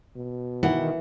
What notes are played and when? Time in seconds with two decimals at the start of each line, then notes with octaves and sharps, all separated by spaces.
0.16 B2
0.63 D#3 E3 F#5